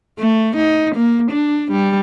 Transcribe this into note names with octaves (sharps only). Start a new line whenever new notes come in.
A3
D#4
A#3
D4
G3